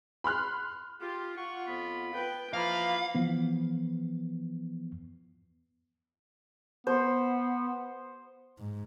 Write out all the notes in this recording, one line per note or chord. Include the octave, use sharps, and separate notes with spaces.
B5 C6 F6 F#6
F4 G4
F4 F#5 C#6
F2 B3 B5
B4 G5
E3 F3 A#3 F4 F5 B5
E3 F3 B3
B3 C5
G#2